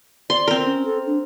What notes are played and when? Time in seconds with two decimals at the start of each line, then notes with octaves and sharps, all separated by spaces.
0.30 D5 C6
0.48 C4 A#4
0.66 C#4
0.85 A4
1.06 D4